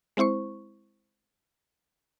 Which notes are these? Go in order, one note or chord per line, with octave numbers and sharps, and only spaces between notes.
G#3 C4 E4 C5 C#6